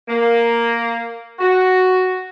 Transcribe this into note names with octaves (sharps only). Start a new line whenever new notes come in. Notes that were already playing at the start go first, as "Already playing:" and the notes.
A#3
F#4